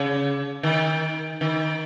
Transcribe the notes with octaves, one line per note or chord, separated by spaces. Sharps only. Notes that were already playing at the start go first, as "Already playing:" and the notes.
Already playing: C#3
D#3
D#3